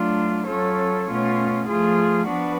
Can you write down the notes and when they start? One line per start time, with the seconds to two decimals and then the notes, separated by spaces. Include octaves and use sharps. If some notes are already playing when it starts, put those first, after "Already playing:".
Already playing: F#3 A3 D4 F4
0.47 F#3 C#4 F4 A4 C#5
1.07 B2 A3 C#4 F4
1.67 F3 A3 F4 G#4
2.27 F3 B3 D4 F#4 B4